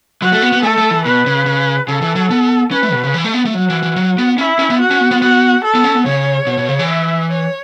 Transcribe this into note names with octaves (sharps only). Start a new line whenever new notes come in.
F#3 F#4
A3
B3
B3
A3 A4
A3
E3
B2 B4
C#3
C#3
C#3 A4
E3
F#3
B3
C#4 B4
A3
B2
C#3
E3
A3
B3
A3
F#3 F#4
E3
E3
F#3
B3
C#4 E4
C#4
B3
F#4
C#4
B3
B3
B3 F#4
A4
B3
C#4
B3
C#3 C#5
B2
B2
C#3
E3
E5
C#5